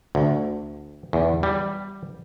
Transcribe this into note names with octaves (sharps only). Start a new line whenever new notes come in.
D2
E2
G3